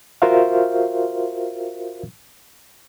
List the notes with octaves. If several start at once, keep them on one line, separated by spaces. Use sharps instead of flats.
F4 F#4 A#4 C5 E5 F5